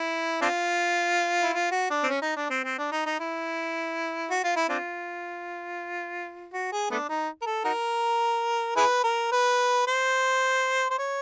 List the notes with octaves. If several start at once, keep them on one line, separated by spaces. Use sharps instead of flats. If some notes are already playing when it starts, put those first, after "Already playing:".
Already playing: E4
C4 D4 F4
E4
F4
F#4
D4
C4
C#4
D#4
D4
C4
C4
D4
D#4
D#4
E4
F#4
F4
E4
C4 D4 F4
F#4
G#4
A3 B3 D4
D#4
A#4
A4
D#4 F#4 A#4
E4 G#4 B4
A#4
B4
C5
C5
C#5